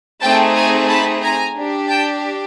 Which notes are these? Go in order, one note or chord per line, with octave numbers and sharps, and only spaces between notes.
A3 C4 D#4 G#4 G5 A5
G#5 A#5
A5 B5
G#5 A#5
D4 G4
G5 A5